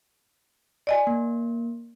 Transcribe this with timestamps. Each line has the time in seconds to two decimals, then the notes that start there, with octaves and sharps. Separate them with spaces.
0.87 D5 D#5 G#5
1.07 A#3